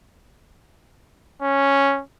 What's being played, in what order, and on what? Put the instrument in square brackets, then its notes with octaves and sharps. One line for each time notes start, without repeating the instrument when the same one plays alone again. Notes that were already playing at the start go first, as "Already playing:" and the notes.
[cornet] C#4